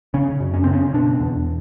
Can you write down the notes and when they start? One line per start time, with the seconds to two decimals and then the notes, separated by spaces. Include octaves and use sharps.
0.14 C#3 C#4
0.40 F#2
0.54 C#4
0.64 C#3 C4
0.74 C#4
0.94 B2 D4
1.20 E2